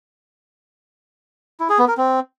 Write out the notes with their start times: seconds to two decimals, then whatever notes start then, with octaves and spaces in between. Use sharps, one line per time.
1.60 E4
1.70 G#4
1.79 B3
1.88 A#4
1.97 C4